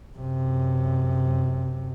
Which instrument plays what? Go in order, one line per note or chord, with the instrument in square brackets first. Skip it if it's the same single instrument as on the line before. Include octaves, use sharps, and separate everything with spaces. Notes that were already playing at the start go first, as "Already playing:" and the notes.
[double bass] F#2 C3